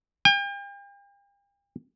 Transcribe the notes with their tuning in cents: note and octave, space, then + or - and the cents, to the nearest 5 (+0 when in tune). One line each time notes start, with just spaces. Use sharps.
G5 +40